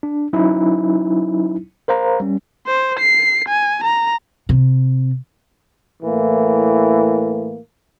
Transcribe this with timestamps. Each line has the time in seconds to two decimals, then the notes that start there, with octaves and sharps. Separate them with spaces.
0.03 D4
0.33 F#3 C#4 D#4 E4
1.88 A#4 C5 F5 A#5
2.20 G3 C#4
2.67 C5
2.99 C7
3.49 G#5
3.84 A#5
4.49 C3
6.02 A2 E3 A#3